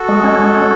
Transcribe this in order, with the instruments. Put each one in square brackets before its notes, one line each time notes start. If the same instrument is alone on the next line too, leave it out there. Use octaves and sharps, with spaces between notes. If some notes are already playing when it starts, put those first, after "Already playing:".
Already playing: [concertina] F#4 A4
[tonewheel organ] G#3
C#4
G#3
C#4